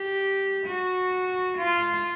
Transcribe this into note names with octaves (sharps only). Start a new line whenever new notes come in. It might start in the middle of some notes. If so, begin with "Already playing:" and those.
Already playing: G4
F#4
F4